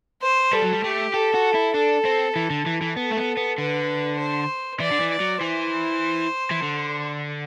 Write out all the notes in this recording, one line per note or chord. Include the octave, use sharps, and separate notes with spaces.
C5
G3 A4
F#3
G3
A3 G4
G4 A4
F#4
E4
D4 A4
C4
E3
D3
E3
E3
B3 A4
A3
B3
B3
D3 B4
C5
E3 D5
D3
E3
D5
F#3
E3 C5
E3
D3